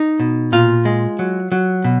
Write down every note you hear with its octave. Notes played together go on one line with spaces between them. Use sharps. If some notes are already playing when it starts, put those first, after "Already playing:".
Already playing: D#4
B2
A#2 F4
G#3
F#3
F#3
B2